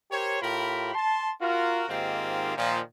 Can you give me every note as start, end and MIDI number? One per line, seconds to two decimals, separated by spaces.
0.11 0.41 67
0.11 0.41 70
0.11 0.41 72
0.11 0.41 73
0.41 0.91 45
0.41 0.91 65
0.41 0.91 67
0.41 0.91 70
0.41 0.91 83
0.94 1.31 81
0.94 1.31 84
1.41 1.84 65
1.41 1.84 66
1.41 1.84 70
1.89 2.55 44
1.89 2.55 51
1.89 2.55 58
1.89 2.55 60
1.89 2.55 65
1.89 2.55 67
2.57 2.80 46
2.57 2.80 51
2.57 2.80 53